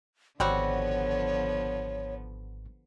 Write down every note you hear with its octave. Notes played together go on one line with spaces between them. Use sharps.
G#1 D3 F3 G3 B3 C4 F#4 C#5